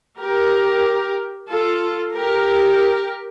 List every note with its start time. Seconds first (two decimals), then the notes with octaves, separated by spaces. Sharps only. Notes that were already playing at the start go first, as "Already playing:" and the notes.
0.19 G4 A#4
1.51 F4 A4
2.16 G4 A#4